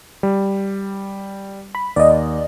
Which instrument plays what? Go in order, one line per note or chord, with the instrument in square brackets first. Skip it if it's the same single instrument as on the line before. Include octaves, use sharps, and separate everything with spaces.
[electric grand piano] G3
[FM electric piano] B5
[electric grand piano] D#2 [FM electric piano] D5 D#5